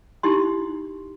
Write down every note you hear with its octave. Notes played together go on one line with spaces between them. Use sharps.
D#4 E4 G4 C6